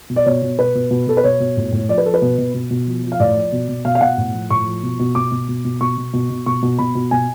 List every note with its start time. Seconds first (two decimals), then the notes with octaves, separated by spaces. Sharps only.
0.09 B2
0.16 D5
0.26 B2 C#5
0.42 B2
0.58 B2 B4
0.75 B2
0.91 B2
1.07 B2 A4
1.17 B4
1.24 B2 C#5
1.40 B2
1.57 A2
1.72 A2
1.89 F3 D5
1.98 B4
2.06 F3 A4
2.14 B4
2.22 B2
2.38 B2
2.54 B2
2.70 B2
2.87 F3
3.03 F3
3.12 F5
3.20 A2 D5
3.36 F3
3.52 B2
3.69 B2
3.85 B2 F5
3.95 F5
4.01 B2 F#5
4.18 A2
4.34 F3
4.50 A2 C#6
4.66 F3
4.83 B2
4.99 B2
5.15 B2 D6
5.31 B2
5.48 B2
5.65 B2
5.81 B2 C#6
5.97 B2
6.13 B2
6.30 B2
6.46 B2 C#6
6.62 B2
6.78 B2 B5
6.95 B2
7.11 B2 G#5